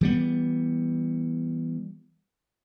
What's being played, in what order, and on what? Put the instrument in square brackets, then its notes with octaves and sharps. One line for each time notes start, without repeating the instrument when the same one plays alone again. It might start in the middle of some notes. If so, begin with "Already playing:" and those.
[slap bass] E3 G3 B3